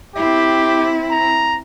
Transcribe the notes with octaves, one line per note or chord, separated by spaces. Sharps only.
C4 E4 G4
A#5